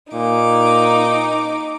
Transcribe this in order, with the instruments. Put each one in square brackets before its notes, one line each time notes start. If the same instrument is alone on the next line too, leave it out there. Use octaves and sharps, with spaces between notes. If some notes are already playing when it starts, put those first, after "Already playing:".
[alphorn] A#2 [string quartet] D#4 D6